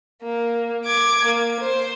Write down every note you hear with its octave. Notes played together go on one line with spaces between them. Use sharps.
A#3
D6 G#6
A#3
C5